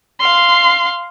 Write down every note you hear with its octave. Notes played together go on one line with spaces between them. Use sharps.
F5 C6